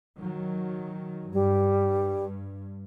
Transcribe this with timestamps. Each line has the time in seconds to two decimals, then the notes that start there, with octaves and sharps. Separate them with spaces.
0.19 D#3 F#3
1.33 G2 G3